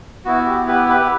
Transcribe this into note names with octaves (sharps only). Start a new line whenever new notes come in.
B3 E4 F#4
G4
G4 B4
G4 B4